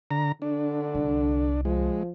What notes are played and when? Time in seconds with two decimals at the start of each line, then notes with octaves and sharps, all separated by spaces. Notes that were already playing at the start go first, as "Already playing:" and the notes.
0.11 D3 A#5
0.42 D3 D4
0.95 C2
1.65 F3 G#3